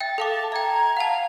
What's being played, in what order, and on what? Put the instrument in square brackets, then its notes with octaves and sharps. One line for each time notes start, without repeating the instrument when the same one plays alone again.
[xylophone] E5 G5 [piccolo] A6
[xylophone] A4 F5 D6 [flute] A5
[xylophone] E5 G5 [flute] A#5 [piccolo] G#6
[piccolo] G#6
[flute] F5 [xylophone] F#5 A5 [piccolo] F7